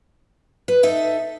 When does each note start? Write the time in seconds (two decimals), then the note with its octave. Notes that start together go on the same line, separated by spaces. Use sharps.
0.68 B4
0.83 D#4 A4 E5